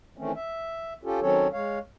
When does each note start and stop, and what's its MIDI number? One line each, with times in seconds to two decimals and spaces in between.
0.18 0.32 51
0.18 0.32 52
0.18 0.32 57
0.18 0.32 60
0.18 0.32 61
0.35 0.93 76
1.04 1.20 61
1.04 1.20 65
1.04 1.20 67
1.04 1.20 69
1.21 1.48 51
1.21 1.48 54
1.21 1.48 60
1.21 1.48 61
1.21 1.48 69
1.21 1.48 73
1.53 1.79 56
1.53 1.79 73
1.53 1.79 77